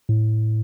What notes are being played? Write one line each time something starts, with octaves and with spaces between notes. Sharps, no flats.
A2